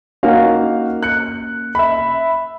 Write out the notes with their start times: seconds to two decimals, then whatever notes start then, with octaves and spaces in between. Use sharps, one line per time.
0.23 A#3 C#4 D#4 F#4 F5
1.03 F#6 C#7
1.75 E5 B5